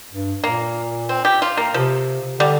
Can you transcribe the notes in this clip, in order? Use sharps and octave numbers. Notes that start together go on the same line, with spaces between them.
G2
A#2 A#3
C4
G4
F4
A#3
C3 F3
D3 G3